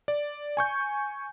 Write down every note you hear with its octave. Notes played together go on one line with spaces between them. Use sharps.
D5
G#5 C#6 G6